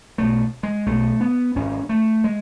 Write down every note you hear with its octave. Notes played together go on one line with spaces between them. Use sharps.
B1 B2 A3
G#3
B1 B2 A3
B3
G#1 G#2 C#4
A3
G#3